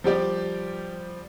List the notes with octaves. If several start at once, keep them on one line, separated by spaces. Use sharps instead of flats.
F3 G3 G4 D5